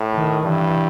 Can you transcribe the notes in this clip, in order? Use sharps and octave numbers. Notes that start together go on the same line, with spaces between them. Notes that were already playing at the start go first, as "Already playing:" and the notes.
Already playing: A2
D#3
G2 E3